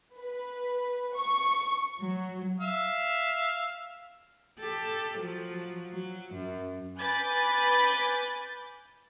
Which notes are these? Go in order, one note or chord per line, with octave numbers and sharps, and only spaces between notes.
B4
C#6
F#3
E5 F5
G4 A4
F3 F#3
F#3
F#2
B4 G#5 B5 D6 G6 A6